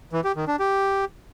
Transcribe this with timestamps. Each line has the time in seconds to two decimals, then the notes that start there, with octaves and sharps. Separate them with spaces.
0.13 E3
0.24 G4
0.36 D#3
0.48 D4
0.59 G4